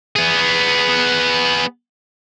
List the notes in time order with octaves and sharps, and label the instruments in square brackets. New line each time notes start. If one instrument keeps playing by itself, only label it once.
[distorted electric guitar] B3 G#4